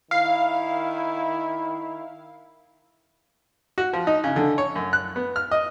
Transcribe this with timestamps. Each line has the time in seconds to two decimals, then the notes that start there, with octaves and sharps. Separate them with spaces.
0.11 D#3 E4 F5 C7
3.78 F#4
3.93 F3
4.07 D#4
4.24 C#3
4.36 D3
4.58 C#5
4.76 F#2
4.93 F#6
5.16 B3
5.36 F6
5.51 D#5